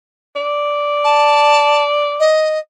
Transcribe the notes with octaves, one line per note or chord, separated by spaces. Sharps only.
D5
A5
D#5